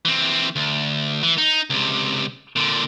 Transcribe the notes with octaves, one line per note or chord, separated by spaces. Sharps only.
E3 C4
D2
E3
D#4
C#2 C3
A#2 D3